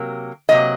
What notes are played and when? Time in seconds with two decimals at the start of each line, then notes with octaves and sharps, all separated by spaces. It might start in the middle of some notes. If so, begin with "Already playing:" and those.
Already playing: C3 F#3 A#3
0.49 C3 F#3 A#3 D#5